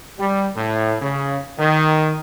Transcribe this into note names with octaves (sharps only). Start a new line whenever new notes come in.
G3
A2
C#3
D#3